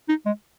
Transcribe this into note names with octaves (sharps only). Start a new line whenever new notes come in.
D#4
G#3